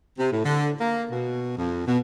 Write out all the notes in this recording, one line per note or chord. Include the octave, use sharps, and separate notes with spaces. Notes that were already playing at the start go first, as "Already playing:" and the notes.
C3
A2
D3
A#3
B2
F2
B2